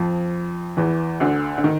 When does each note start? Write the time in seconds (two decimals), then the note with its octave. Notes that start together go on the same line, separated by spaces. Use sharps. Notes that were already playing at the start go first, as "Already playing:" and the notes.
Already playing: F2 F3
0.77 E2 E3
1.20 D2 D3
1.58 D3
1.64 D#3